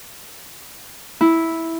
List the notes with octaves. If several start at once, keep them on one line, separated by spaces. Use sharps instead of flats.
E4